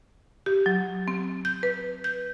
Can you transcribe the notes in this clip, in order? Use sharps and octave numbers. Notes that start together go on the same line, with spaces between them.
G4
F#3
C4
G6
B4
G6